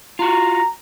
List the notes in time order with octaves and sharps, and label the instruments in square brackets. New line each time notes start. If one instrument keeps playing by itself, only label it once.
[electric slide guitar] F4 F#4 [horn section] A#5